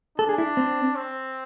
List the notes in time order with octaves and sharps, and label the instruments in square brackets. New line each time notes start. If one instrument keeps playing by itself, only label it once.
[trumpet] D4 [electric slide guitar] A4
[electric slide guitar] G#4
E4
C4
[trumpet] C4